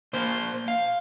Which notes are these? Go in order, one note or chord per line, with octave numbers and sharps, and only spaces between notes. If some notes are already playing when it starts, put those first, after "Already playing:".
A#2 A#3 C5
F5